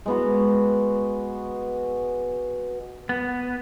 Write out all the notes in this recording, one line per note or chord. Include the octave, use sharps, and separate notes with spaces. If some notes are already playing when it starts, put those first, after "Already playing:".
G#3 B3 F#4
B3